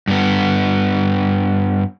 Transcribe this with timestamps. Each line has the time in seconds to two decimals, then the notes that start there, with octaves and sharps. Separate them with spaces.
0.08 G2 B3